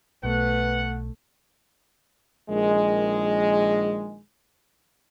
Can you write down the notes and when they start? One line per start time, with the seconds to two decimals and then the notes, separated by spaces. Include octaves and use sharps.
0.23 B1 B2 A3 B4 F#5
2.50 A#1 D#3 G#3